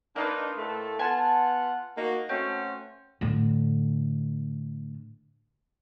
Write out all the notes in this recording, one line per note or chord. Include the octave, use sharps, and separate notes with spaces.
A#3 D4 D#4 F4 B4
A2 A3 A4
B3 F4 F#5 G#5 A5
A#3 D#4 F#4
A3 C4 C#4 F#4
A2 D3